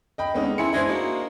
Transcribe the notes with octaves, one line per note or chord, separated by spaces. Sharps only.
D#5 G5 B5
F2 D3 G#3 B3 C#4 D#4
E3 E4 G#5 C6 C#7
G#3 D4 E4 C5
A#3 D#4 F#4